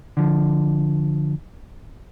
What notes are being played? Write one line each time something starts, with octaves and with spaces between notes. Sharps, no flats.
D3 F3